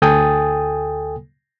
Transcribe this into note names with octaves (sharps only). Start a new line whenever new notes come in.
D2 A4 G5 G#5 D#6 A6